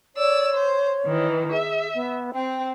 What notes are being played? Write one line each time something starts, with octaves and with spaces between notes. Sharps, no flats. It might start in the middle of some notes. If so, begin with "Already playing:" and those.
C#5 D5 E6
C5
D#3 E3
G#4 E5
B3
C4 G5